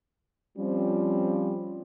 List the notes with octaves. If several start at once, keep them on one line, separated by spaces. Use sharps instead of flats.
F3 G3 C4 C#4